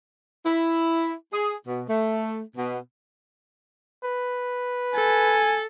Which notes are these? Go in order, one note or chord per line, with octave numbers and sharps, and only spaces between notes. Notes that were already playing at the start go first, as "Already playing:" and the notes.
E4
G#4
B2
A3
B2
B4
A4 G#5